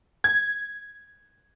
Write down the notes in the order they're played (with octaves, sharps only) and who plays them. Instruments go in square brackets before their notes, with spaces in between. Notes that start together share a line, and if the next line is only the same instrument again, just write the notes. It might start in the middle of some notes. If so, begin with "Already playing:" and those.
[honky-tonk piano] G#6